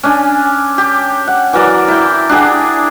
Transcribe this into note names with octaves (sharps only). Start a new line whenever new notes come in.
C#4 D4 G#5
G4
F#5
E3 F#3 A#4 D5
E4 G5
D4 G4 G#4 F#5